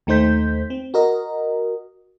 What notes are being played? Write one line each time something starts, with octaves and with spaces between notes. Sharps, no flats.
D#2 A3 D#4 C5 G6 B6
C4
F#4 A#4 D#5